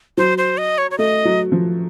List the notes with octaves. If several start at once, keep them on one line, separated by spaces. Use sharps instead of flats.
F#3 C5
C5
D#5
C#5
C#5
A3 D#5
F#3
F3